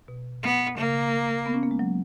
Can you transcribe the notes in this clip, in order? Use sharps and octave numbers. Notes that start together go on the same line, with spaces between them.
B2
B3
C#3 A#3
B3
C#4
A#3
G#3
F#3